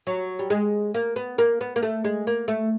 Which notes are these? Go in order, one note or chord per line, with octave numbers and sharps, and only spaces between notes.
F#3
G3
G#3
A#3
B3
A#3
B3
A#3
A3
G#3
A#3
A3